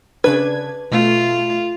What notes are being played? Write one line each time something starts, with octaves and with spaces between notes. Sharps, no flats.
C#3 D4 B4 G#6
B2 A3 F4